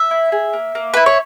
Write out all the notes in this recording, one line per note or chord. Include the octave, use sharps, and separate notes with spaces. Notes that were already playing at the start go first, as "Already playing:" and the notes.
Already playing: E5
E4
G#4
A#3
A#3
E4 B4
C#5